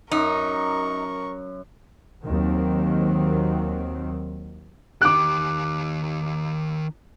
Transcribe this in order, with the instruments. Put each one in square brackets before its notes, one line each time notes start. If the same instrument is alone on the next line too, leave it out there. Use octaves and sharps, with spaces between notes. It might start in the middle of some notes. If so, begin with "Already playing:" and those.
[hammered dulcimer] F#2 [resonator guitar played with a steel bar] D#4 [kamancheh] A#4 C#6
[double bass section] D#2 D#3 F#3 C4
[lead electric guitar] D#3 G4 [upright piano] D6 F#6